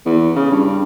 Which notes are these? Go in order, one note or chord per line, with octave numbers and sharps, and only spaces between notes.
E2
C#3
G2